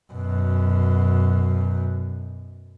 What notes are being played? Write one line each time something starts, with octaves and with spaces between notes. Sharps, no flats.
F#2 B2